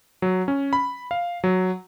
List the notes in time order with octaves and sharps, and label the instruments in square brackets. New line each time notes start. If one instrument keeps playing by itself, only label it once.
[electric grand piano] F#3
C#4
B5
F5
F#3